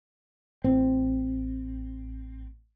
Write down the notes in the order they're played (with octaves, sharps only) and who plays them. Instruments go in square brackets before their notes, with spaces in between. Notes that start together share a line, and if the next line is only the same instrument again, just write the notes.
[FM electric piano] A1 A2 [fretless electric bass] C4